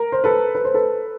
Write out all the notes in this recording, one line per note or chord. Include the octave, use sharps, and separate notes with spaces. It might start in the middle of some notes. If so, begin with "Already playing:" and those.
Already playing: A#4
C5
A4 B4
B4
C5
A4 B4